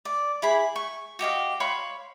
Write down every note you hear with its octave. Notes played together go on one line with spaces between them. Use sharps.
D5
E4 G#4 B5
C#6
F#4 G4 D#5 F5
C#5 F5 B5 C6